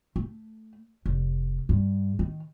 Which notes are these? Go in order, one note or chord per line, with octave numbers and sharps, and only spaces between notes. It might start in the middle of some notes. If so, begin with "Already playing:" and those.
A3
F1
G2
D#3